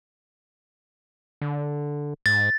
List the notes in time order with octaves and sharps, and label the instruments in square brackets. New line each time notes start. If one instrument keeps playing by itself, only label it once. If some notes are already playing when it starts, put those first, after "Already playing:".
[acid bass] D3
[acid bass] G#2 [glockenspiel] A6